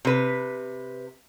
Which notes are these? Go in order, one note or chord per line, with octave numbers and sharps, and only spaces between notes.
C3 B4